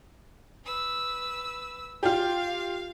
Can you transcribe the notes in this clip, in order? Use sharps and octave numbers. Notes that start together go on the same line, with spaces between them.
B4 E6
F4 G4 F5